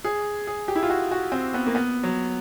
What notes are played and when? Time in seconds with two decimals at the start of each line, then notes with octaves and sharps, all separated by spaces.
0.05 G#4
0.47 G#4
0.68 G4
0.76 E4
0.83 F4
0.90 F#4
1.11 F#4
1.32 C4
1.54 B3
1.67 A#3
1.75 B3
2.03 F#3